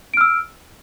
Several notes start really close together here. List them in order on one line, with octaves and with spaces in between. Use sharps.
D7 F6 E6